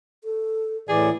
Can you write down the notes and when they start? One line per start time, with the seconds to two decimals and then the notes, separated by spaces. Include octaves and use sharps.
0.24 A4
0.89 A2 E3 E4 G#4 D5